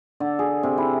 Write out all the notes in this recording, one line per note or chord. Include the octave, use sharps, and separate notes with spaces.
D3
G#4
C3
E4